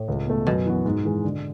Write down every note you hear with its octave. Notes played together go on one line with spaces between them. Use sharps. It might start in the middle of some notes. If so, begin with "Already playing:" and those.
Already playing: A2
C#2
B2 A3
F#2 B2
E3 B3 F#4
G#2
E3 G#3
D3